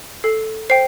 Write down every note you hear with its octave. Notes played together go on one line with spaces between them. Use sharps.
A4 C7
C5 G5 C7